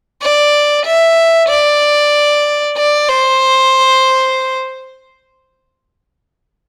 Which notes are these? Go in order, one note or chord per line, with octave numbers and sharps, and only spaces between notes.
D5
E5
D5
D5
C5